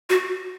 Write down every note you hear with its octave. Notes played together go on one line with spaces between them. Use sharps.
F#4